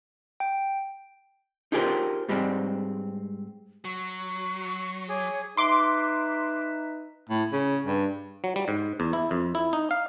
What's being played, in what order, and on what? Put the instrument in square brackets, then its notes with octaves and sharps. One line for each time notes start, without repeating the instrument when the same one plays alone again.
[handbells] G5
[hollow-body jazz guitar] D#4 F4 G4 G#4 A#4 C5
G#2 G3 G#3 C4
[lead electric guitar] F#3 [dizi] C#6
[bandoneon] G#4 [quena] C#5 [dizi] D6
[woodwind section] D#4 B4 E5 [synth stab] C6 D6
[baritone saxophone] A2
C#3
G2
[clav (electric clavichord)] F#3
G3
G#2
E2
E4
F2
E4
D#4
F5